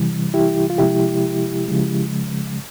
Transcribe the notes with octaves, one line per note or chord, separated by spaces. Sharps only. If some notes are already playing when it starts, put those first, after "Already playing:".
Already playing: C3 E3 G3
E4 G4
F4
C3 F3 G#3 E4 G4
C#3 F3 G#3